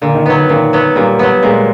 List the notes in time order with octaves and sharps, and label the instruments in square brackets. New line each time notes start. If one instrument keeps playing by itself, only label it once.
[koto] A#2 [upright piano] D3
[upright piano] D#3
[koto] F#3 B3
[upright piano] D#3
[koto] A#2 [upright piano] D#3
[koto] F#3 B3
[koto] A#2 [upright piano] G3
[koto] F#3 B3
[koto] A#2 [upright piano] G#3